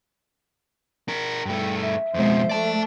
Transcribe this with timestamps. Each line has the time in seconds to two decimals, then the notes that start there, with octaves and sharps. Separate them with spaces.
1.08 D4 A#4
1.46 G2 A3 G5
1.81 E5
2.14 F2 B2 F3 G#3 C5
2.49 A3 D5 A5